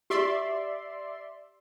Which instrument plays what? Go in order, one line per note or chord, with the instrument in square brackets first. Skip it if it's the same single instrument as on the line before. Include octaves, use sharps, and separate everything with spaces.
[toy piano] G4 [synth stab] D5 E5 C6